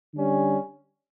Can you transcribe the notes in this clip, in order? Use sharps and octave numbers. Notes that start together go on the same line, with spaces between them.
D3 G3 C#4